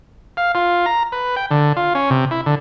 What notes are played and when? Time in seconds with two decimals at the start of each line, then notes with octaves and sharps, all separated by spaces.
0.37 F5
0.55 F4
0.86 A#5
1.12 B4
1.36 G5
1.51 D3
1.77 F4
1.95 C#4
2.10 C3
2.31 E4
2.46 D3